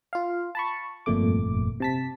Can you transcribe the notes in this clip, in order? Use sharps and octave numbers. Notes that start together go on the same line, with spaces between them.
F4 F5
A5 B5 C#6
G1 F2 A#2 A3 D6
C3 A5 B6